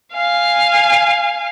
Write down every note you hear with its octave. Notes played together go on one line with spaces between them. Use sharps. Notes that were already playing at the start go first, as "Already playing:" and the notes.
F5 G#5